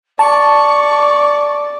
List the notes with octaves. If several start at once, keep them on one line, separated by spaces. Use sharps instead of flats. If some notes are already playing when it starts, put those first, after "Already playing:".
D5 A5 C#6